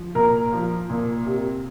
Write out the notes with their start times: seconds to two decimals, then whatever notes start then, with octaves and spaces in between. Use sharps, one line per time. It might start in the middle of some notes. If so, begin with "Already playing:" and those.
Already playing: F3
0.15 A#2 A#4
0.52 F3
0.90 A#2
1.26 C3